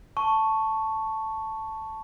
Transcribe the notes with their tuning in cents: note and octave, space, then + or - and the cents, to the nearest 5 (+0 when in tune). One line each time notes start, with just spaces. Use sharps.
A5 +0 C#6 +0